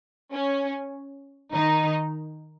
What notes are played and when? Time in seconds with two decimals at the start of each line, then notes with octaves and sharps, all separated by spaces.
0.32 C#4
1.52 D#3 D#4